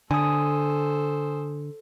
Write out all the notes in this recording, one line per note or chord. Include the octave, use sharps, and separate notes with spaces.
D3 A4 C5 G#5 D#6